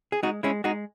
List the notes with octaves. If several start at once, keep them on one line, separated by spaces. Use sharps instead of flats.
G#4
G#3 D#4 F#4
G#3 C#4 E4
G#3 D#4 F#4